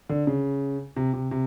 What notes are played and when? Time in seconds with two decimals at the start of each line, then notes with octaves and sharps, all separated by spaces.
0.09 D3
0.27 C#3
0.96 C3
1.13 C3
1.31 C3